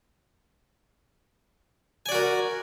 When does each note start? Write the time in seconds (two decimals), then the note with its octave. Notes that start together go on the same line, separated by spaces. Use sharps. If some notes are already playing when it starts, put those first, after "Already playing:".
2.06 G#5
2.09 D5
2.12 F#4
2.15 A#4